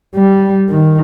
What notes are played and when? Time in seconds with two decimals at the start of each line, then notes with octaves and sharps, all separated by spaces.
0.15 G3
0.70 D#3